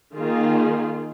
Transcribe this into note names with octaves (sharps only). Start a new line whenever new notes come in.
D#3 A#3 F4 G#4